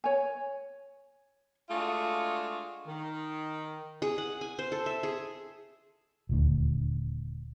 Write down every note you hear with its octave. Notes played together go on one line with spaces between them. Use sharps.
C#5 G#5
G#3 A3 D4 F4 F#4 G#4
D#3
G#4
F#5
G#5
C5
A4
E5
G#4
D#1 D2